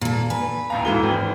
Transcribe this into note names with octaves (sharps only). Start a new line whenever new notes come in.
A#2 A4
B4 G#5
A1 D#2 F5 A#5
G#2 E3 F#4 A4 D#7 G7
G#1 G5